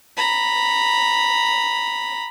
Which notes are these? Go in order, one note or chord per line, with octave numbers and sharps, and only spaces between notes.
A#5 B5